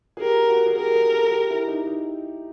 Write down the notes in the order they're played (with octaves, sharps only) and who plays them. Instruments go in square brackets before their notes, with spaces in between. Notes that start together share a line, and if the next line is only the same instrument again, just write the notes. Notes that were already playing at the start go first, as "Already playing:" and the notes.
[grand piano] G#4
[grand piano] G4 [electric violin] A#4
[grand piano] F#4
G#4
[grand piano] G4 [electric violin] A#4
[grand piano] G#4
A4
G4
E4
D#4
D#4